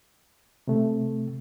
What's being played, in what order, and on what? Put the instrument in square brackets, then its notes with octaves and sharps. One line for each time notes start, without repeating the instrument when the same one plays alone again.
[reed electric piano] C3 A3